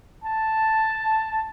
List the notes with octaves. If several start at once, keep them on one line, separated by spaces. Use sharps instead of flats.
A5